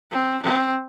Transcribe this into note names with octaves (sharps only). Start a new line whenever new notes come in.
C4
C4